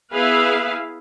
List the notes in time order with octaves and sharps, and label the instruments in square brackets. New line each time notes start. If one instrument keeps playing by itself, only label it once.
[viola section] B3 E4 G#4 B4 E5 F5